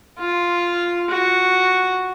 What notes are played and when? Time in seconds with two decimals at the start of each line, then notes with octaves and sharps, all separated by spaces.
0.19 F4
1.10 F#4